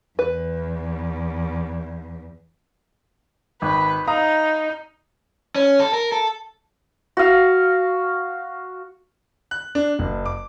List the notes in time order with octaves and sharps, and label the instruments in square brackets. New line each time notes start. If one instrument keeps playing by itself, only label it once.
[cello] E2 [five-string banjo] B4
[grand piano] G#1 [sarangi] B4
[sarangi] D#4 [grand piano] F5 A#5 D#6
[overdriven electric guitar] C#4
A4
A#4
A4
[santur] F#4 F5
[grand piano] F#6
D4
F#1
D6